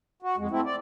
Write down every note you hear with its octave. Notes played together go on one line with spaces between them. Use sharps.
F#4
F2 G#3
A3 C4 E4
D5